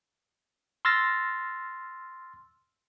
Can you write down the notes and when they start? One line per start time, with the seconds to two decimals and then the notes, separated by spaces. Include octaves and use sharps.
0.85 C6 E6 F6 A6 A#6